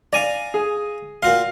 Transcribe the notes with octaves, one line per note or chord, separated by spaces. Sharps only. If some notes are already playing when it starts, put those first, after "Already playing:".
D5 F5 G#5 A#5
G#4
A#2 F#4 F5 C6